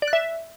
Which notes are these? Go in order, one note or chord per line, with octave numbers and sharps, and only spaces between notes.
D5
F#6
E5